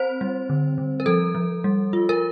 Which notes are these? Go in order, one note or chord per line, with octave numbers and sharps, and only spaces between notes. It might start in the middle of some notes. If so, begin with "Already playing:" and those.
Already playing: C4 C5
G3
D3
D3
A#4
F3 A4
F3
G3
F4
A#4